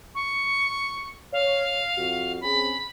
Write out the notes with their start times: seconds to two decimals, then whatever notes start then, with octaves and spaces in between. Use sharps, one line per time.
0.15 C#6
1.33 C#5 F5
1.97 F2 F#4
2.41 C4 C#4 G#4 B5